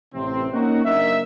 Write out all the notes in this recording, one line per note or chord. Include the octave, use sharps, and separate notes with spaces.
A1 C3 C4
A#3 C#4 D#4 F#4
F#1 A#3 D4 A#4 D#5 E5